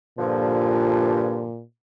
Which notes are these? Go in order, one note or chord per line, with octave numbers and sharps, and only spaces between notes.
G2 A#2 D3 F3